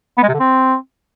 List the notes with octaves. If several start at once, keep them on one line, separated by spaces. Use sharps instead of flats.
B3
G#3
C3
D3
C4